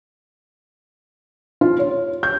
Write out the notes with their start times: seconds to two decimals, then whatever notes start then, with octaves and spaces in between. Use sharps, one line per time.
1.61 F4
1.79 C#5
2.23 G6